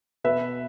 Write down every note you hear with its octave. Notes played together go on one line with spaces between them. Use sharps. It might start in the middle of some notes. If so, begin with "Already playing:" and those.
B2 B4 E5